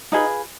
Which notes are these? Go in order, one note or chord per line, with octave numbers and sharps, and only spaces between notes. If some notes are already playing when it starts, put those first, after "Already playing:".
D#4 F4 G#4 B4 D#5